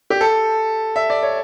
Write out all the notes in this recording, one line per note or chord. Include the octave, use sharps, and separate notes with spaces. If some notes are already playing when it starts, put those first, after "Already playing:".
G4
A4
E5
D5
C#5